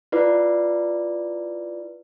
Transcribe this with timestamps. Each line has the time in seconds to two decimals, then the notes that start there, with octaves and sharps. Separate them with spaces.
0.12 E4 F4 B4 D5